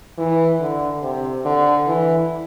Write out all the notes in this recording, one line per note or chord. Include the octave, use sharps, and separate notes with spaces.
E3
D3
C3
D3
E3